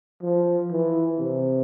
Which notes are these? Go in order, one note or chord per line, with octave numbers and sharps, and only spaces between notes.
F3
E3
C3